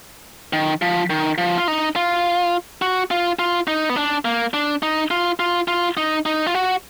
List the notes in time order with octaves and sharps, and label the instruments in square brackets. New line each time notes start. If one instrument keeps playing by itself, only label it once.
[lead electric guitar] D#3
F3
D#3
F3
F4
D#4
F4
F#4
F4
F4
D#4
B3
D4
A#3
D4
D#4
F4
F4
F4
D#4
D#4
F4
F#4